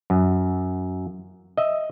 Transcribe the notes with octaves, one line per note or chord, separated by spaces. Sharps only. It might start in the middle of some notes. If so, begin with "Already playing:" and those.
F#2
D#5 E5